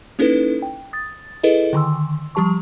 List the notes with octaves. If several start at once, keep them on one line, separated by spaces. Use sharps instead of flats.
A#3 C#4 D#4 E4 A4 B4
G5
D#6 A6
E4 G#4 A4 B4 D#5
D3 D#3 C6 E6
F3 G3 G4 A5 C#6